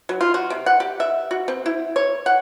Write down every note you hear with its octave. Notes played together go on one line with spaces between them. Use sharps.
F#3
F4
F#4
C3
F#5
G4
E5
F#4
C4
E4
C#5
F#5